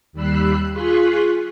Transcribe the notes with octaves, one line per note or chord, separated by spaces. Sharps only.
D#2 G3 B5 E6 F#6 C7
F4 G#4 C6 C#6 F#6 B6